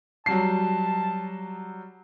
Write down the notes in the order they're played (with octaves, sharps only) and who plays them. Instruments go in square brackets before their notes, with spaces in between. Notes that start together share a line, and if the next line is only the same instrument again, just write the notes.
[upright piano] F#3 G3 C7 [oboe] A5